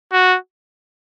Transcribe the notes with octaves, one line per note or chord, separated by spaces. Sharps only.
F#4